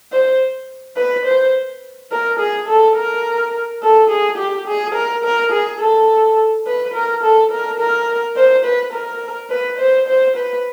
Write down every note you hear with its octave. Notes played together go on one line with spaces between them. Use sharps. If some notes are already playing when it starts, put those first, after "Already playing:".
C5
B4
C5
A#4
G#4
A4
A#4
A4
G#4
G4
G#4
A#4
A#4
G#4
A4
B4
A#4
A4
A#4
A#4
C5
B4
A#4
B4
C5
C5
B4